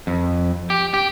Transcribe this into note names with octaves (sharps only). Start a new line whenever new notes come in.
F2
G4
G4